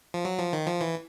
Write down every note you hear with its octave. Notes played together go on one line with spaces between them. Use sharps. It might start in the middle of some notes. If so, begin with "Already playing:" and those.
F3
F#3
F3
D#3
F3
E3